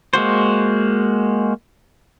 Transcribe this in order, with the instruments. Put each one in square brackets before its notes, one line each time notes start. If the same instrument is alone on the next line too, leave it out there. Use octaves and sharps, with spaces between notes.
[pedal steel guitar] G#3 A#3 F#4 C5